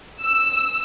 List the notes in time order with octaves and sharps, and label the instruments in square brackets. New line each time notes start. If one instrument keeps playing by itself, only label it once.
[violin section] E6